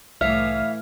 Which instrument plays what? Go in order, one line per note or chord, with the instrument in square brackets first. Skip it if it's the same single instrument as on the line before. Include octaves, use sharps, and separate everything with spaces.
[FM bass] C2 [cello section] A2 E3 [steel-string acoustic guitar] C#5 E5 F5 [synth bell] F6